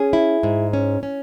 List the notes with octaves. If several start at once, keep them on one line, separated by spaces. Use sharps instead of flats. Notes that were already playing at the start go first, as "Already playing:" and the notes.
Already playing: C#4 G#4
E4
G#2
C#4
C#4